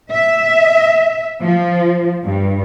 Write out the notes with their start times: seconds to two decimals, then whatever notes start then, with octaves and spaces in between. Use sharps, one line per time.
0.12 E5
1.41 F3
2.25 G2